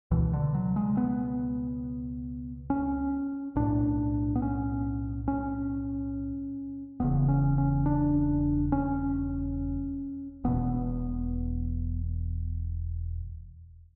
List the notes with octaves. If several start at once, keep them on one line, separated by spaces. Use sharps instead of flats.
C#2 B2 E3
D3
F#3
G#3
B3
C#4
B1 A2 D4
B3
C#4
C#4
E1 E2 C#3 B3
C#4
C#4
D4
C#4
E1 E2 B2 B3